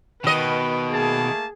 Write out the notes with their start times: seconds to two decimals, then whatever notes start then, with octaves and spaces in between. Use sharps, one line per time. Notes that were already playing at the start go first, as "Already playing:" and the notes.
0.24 B2 D#3 B4 D#5
0.91 A3 A#3 G#4 A5